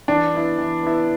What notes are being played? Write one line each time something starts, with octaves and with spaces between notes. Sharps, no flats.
E3 D4
B3 E4
E3
B3 E4